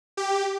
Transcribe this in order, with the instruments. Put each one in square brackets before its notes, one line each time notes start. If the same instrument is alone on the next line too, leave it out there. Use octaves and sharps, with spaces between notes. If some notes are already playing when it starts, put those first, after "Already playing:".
[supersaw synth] G4